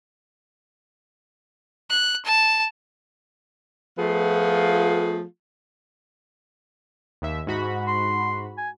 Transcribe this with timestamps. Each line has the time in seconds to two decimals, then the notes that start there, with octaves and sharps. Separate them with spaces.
1.90 F#6
2.25 A5
3.97 F3 A3 B3 F4 G#4
7.22 D#2 E5
7.47 G#2 F#4 B5
7.87 C6
8.58 G#5